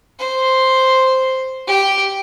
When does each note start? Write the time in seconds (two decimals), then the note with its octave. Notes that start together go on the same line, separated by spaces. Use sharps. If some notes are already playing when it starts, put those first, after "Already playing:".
0.19 C5
1.68 G4